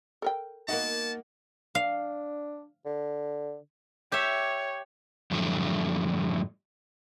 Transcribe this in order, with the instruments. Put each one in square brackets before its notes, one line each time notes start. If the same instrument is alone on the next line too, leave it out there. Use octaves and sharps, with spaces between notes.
[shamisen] A4 A#4 G5
[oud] A#3 B3 F#4 [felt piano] D#4 D#5 F#5 [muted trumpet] A5
[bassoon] D4 [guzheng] F5
[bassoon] D3
[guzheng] G4 E5 [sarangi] C#5
[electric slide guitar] F#2 A2 D3 F3 G3 A3